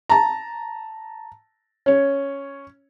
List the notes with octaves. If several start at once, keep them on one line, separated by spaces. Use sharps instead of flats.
A5 A#5
C#4 C#5